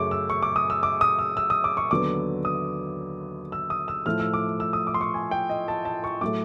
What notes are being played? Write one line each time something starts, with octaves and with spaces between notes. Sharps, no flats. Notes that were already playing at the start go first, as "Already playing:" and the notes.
Already playing: F#2 C#3 F#3 A3 C#6 D6
E6
C#6
D6
D#6
E6
D6
D#6
E6
E6
D#6
D6
C#6
D#2 D3 F#3 B3 D6
D#6
E6
D#6
E6
A2 F3 A3 F6
E6
D6
E6
D#6
D6
C6
C#6
G#5
G5
D#5
A5
A5
C#6
A2 F#3 A3 D6